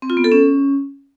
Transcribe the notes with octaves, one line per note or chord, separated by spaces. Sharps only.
C4
F4
B3
A4
C#4